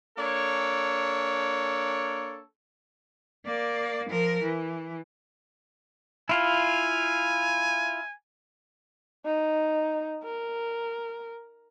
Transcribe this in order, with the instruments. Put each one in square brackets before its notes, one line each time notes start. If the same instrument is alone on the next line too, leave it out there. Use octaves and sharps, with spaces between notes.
[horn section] A#3 D4 A4 C#5
[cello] A#3 D5
F3 A#4
E3
[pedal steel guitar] E4 F4 [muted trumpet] G#5
[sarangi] D#4
A#4